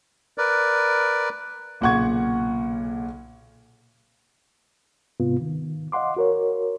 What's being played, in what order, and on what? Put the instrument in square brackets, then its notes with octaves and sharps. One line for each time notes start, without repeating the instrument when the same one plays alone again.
[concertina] A#4 B4 D5
[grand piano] B1 A#2 C#3 F#5 C#6 G#6
[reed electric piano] G#2 C3 B3 F4
D#3
D#5 F5 F#5 C6 D6
F#4 A#4 C#5